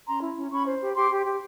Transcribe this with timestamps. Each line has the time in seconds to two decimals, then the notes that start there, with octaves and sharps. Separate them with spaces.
0.07 C#4 A#5 C6
0.22 E4
0.36 C#4
0.51 C#4 B5 C#6
0.67 C5
0.81 G4
0.96 G4 C6 D6
1.11 G4
1.25 G4